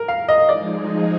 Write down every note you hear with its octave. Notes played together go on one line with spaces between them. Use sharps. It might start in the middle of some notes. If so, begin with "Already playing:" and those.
Already playing: A#4
F5
D#5
F3 G#3 D#4 G#4 D5